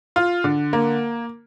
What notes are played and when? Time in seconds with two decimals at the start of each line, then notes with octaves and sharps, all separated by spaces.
0.16 F4
0.44 D3
0.73 A#3